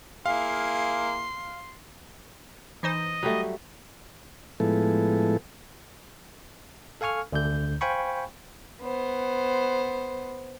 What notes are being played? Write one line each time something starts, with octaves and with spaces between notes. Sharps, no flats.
A#3 E4 G#4 F5 C6
E3 D#4 C5 D#5
F#3 G3 A3
A2 F3 G#3 B3 E4 A4
A4 F5 G#5 C#6 F6
D2 D3 G6
C5 F5 G5 G#5 B5 C#6
B3 C5